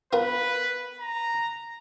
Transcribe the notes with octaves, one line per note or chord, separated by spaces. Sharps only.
B3 F4 A#4 B4
A#5